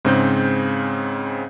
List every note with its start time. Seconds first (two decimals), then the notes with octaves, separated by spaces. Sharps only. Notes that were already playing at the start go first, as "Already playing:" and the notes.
0.05 G#2 C#3 C4 G#4 G6